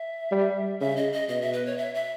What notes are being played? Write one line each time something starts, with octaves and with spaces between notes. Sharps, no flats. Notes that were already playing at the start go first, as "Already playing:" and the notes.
Already playing: E5
G3
C#3 E5
D#5
D#5
B2 D#5
E5
B4
C#5
E5
E5